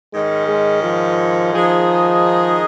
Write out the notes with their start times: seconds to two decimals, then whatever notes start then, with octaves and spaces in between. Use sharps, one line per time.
0.12 G#2 D#3 G#3 C#4
0.48 G#3
0.83 F3
1.54 D#3 F3 G#3 D#4 G#4